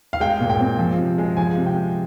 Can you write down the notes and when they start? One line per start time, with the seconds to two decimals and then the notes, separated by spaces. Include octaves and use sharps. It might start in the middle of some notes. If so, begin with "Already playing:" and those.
0.13 F5
0.20 G#3 G5
0.41 A#2
0.50 G5
0.60 C4
0.78 F3
0.98 C3
1.18 G#3
1.37 F3 G#5
1.57 C3
1.66 G5
1.76 G#3